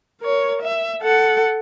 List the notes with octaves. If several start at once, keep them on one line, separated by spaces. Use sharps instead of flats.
A#4 C#5
E5
A4 F#5